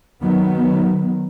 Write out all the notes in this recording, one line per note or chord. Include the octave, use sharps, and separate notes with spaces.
D#3 F#3 B3